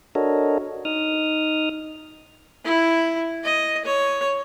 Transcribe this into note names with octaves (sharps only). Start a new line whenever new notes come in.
D4 F#4 A4 A#4 C#5 D#5
D#4 D#6 F6
E4
D#5
C#5